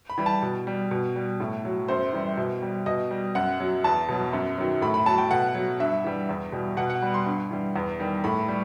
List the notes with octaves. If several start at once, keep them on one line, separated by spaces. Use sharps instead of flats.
B5
E3 G3
A5
B2
G3
B2
G3
A2
F#3
F#2 C5
E3 G3
B2
G3
B2 D#5
G3
F#2 F#5
F#3
E2 A5
B2 F#3
F#2
D#3 F#3
A2 B5
B5
F#3 A5
G5
B2 F#5
F#3
G2 E5
E3 G3
E2
B2 G3
B2 F#5
F#5
G3 B5
C6
G2
E3 G3
E2
D#3 G3
A2 B5
G3